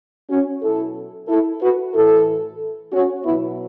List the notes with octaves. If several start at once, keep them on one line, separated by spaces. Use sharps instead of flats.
C#4 F#4
B2 F#3 E4 A4
E4 A4
F#4 B4
A2 E3 E4 A4
C#4 F#4
B2 F#3 B3 E4